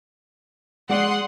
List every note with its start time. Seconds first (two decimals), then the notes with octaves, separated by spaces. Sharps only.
0.90 G#3 D5 F#5 C6 D#6